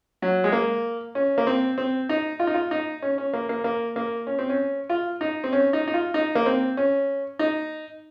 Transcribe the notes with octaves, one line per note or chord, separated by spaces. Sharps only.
F#3
G#3
A#3
C#4
A#3
C4
C4
D#4
F4
D#4
F4
D#4
C#4
C#4
A#3
A#3
A#3
A#3
C#4
C4
C#4
F4
D#4
C4
C#4
D#4
D#4
F4
D#4
A#3
C4
C#4
D#4